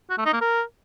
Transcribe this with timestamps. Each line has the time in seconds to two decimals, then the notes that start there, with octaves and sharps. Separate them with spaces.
0.10 F#4
0.18 A3
0.26 D#4
0.33 A#3
0.41 A#4